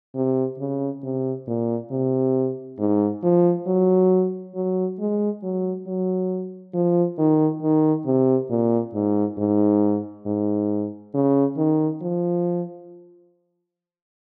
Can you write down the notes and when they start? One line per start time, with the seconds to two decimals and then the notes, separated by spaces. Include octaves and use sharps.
0.15 C3
0.59 C#3
1.03 C3
1.47 A#2
1.91 C3
2.79 G#2
3.23 F3
3.67 F#3
4.55 F#3
4.99 G#3
5.43 F#3
5.87 F#3
6.74 F3
7.18 D#3
7.62 D#3
8.06 C3
8.50 A#2
8.94 G#2
9.38 G#2
10.26 G#2
11.14 C#3
11.57 D#3
12.01 F3